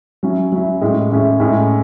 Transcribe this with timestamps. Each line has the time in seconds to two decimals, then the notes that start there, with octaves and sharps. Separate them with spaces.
0.23 F#3 C#4 E4
0.52 F#3 C#4 E4
0.81 A2 G#3 C#4 E4
1.11 A2 G#3 C#4 E4
1.40 A2 G#3 C#4 E4